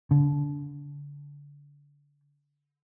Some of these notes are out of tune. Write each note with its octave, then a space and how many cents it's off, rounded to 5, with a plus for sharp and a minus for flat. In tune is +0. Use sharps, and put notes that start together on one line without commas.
D3 -30